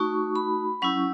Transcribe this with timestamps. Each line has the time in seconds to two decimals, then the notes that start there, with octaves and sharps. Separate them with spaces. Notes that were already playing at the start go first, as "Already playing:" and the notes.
Already playing: A3 D#4 F#4 C#6
0.36 B5
0.82 F#3 C#4 E4 C#6